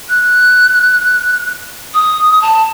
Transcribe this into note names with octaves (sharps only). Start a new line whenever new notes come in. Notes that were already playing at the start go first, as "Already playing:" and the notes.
F#6
D#6
A5